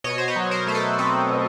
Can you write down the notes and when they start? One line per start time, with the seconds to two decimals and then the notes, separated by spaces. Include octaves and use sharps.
0.04 B2 C#5 D#5
0.18 C5
0.28 B4 C#5
0.36 F#3
0.51 A#4 C5
0.67 A3 C5
0.75 A4 B4
0.98 C4 A4 B4
1.30 B2